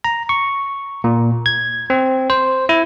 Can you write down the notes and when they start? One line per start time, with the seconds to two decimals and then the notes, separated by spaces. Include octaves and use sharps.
0.04 A#5
0.29 C#6
1.04 A#2
1.46 G#6
1.90 C4
2.30 C5
2.69 E4